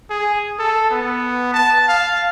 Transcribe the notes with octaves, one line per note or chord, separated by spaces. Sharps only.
G#4
A4
B3
A5
F5